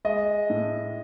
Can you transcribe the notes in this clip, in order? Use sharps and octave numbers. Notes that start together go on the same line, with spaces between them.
G#3 D#5
A2